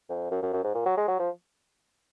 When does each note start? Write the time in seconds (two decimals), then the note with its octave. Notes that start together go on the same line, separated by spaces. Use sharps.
0.09 F2
0.31 F#2
0.42 F#2
0.54 F#2
0.64 G#2
0.75 A#2
0.86 F#3
0.97 G#3
1.08 F#3
1.19 F3